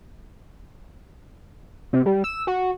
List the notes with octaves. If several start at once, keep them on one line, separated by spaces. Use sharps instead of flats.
C3
G3
E6
F#4